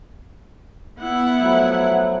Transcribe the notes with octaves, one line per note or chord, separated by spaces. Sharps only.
B3 E4 F#5
F3 F#3 A3